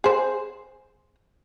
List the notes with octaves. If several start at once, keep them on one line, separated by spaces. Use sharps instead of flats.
G#4 C5